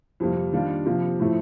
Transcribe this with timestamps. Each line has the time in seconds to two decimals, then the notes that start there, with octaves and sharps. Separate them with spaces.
0.20 F2 C3 G3 A#3
0.53 D#3 G3 A#3 D4 F4
0.86 C3 F3 A#3
1.20 A2 F3 A3